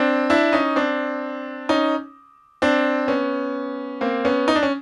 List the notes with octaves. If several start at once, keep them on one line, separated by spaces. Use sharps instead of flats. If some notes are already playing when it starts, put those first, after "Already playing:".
Already playing: C4 D4
D4 E4
C#4 D#4
C4 D4
C#4 D#4
C4 D4
B3 C#4
A#3 C4
B3 C#4
D#4
D4
C#4